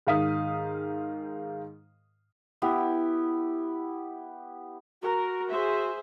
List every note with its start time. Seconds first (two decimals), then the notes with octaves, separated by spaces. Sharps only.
0.07 G#2 D#3 A#4 F5 D#6 B6
2.62 B3 E4 G4
5.02 F#4 A#4
5.50 G#4 C5 E5